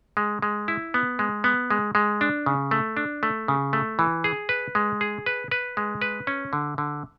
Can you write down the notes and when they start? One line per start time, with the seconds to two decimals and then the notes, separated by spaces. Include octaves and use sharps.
0.17 G#3
0.42 G#3
0.68 E4
0.94 B3
1.19 G#3
1.44 B3
1.70 G#3
1.95 G#3
2.21 D4
2.46 C#3
2.71 A3
2.97 D4
3.23 A3
3.48 C#3
3.73 A3
3.99 E3
4.24 G#4
4.49 B4
4.75 G#3
5.01 G#4
5.26 B4
5.51 B4
5.77 G#3
6.02 B4
6.27 C#4
6.53 D3
6.78 D3